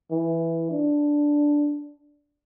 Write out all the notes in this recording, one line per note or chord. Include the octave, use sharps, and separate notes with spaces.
E3
D4